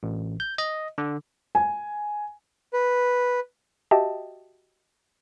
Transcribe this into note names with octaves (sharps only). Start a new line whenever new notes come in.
A1
G6
D#5
D3
G#5
B4
F#4 G4 D#5 E5 G5 A5